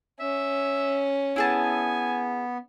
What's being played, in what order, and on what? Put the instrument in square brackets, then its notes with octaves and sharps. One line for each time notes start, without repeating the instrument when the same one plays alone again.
[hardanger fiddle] C#4 [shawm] E5
[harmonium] B3 [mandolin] E4 G#4 A5 [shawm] G#5